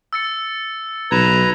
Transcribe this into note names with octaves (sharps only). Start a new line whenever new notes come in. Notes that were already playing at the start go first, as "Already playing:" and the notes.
E6 A6 C#7
B1 B4 A#5 G#6 E7